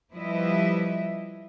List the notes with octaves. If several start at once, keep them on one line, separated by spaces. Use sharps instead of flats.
F3 G3 E4 B4 D#5 E5